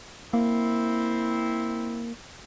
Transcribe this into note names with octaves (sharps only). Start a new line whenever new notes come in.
A#3 C4 E4